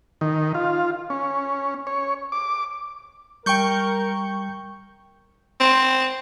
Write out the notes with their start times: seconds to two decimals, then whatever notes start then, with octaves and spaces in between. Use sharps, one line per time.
0.21 D#3
0.55 F4
1.10 C#4
1.87 C#5
2.32 D6
3.46 G3 A#4 G5 C#6 G6
5.60 C4